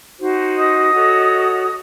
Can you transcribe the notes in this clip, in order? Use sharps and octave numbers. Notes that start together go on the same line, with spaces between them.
D#4 F#4 C5
D#5 D#6
F#4 A4 C#5